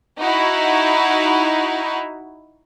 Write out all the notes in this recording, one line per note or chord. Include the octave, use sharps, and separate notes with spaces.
D#4 E4 F#4